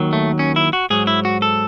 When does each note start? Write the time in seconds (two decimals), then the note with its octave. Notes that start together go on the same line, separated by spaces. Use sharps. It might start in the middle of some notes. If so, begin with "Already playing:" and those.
Already playing: D#2 D#3 F#3
0.13 A3
0.39 C#4
0.56 E4
0.73 F#4
0.90 G#2 F#3 G#4
1.07 E4
1.25 F#4
1.42 A4